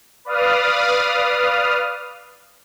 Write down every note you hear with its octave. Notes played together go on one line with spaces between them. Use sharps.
B4 D5 F5 D#6 F6